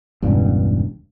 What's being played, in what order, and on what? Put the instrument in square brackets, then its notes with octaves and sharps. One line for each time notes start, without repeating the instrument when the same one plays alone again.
[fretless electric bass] E1 C#2 G2